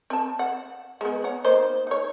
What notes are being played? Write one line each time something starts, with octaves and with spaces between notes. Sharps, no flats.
C4 A5
F#5
G#3 B3
C#5 F#5
A#3 D#4 C5
D#4 C#5